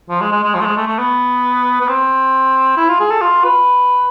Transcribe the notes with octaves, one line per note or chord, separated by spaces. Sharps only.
F3
G#3
G#3
G#3
F3
A3
G#3
A3
A3
B3
B3
C4
E4
F4
G#4
A4
F4
B4